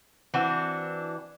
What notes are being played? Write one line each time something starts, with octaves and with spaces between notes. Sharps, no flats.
E3 C4 D4 F#4